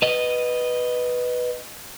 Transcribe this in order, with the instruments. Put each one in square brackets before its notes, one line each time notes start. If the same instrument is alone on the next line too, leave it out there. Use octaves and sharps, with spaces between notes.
[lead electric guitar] B4 D#5